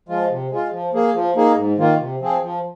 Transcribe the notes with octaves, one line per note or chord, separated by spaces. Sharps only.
F3 G#3 F4
C3
G#3 F4
F3
A#3 G#4
F3
A#3 D#4 G#4
G#2
D#3 A#3 F4
C3
F3 C4 G#4
F3